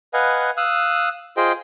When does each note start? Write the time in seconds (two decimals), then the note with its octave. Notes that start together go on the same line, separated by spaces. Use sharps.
0.13 B4 D#5 F5 F#5 G#5
0.57 F5 D#6 E6 F#6
1.37 F4 G#4 C5 D#5 G5